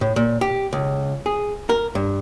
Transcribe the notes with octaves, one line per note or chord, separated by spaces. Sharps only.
A2
A#2
G4
C#2
G#4
A#4
G2